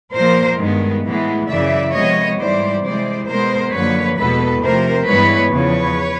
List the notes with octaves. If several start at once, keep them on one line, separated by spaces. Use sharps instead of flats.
A#2 F3 A#3 A#4 C5
G2 D#3 G#3 B3
A2 E3 G#3 B3
F#2 C#3 E3 D5 E5
C3 F3 G#3 B3 C#5 D#5
G#2 E3 G3 C5 D5
C3 E3 G#3 C5 D5
B2 G#3 B3 A#4 C5
F#2 D3 F3 A#3 B4 C#5
E2 B2 G#3 B3 A4 B4
C3 F3 A3 A#4 C5
G2 E3 G#3 B3 B4 C#5
E2 C#3 F3 B4 C#5